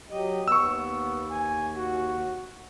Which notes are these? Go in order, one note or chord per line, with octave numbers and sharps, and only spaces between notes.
F#3 G4 D#5
D#2 B3 C#6 E6
G#5
F#4